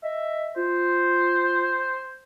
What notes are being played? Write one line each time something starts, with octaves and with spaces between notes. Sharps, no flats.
D#5 E5
F4 C5